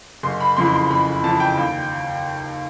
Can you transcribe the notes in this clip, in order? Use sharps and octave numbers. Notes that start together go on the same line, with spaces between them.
F#1 C6
B5
F2 C#3 E3 C6
C6
F#1 B5
F2 C#3 E3 A5
G5
D#2